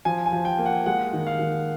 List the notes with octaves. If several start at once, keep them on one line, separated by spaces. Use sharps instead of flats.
F3 G#5
G#5
F3
G5
A#3
F#5
G#3 F#5
D#3
F5
D#3